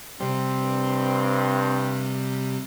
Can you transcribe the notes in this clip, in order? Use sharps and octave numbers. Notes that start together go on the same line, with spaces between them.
C3 G3 C4
G2